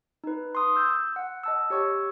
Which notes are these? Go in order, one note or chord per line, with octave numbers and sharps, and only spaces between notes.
D#4 B4
C6 D#6
E6 G6
F#5
D#5 A5 E6
G4 C#5 C#6 E6